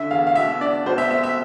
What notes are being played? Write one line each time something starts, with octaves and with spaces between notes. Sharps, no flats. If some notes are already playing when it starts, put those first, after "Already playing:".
Already playing: D3 E5
E2 F5
F5
B2 E5
D4 D5
B2 C5
E5
C4 E5
E5